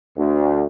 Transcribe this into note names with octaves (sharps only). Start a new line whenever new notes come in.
D2